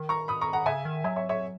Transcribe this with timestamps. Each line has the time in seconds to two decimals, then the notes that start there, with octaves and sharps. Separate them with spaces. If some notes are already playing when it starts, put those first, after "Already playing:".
Already playing: D#3
0.09 A#5 C#6
0.28 B5 D#6
0.41 A#5 C#6
0.53 F#5 A#5
0.66 C#3 E5 G#5
0.85 D#3
1.04 F#3 E5 G#5
1.16 C#5 E5
1.29 C#5 E5